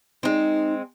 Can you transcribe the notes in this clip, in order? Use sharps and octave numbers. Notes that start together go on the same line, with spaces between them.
G#3 C4 D#4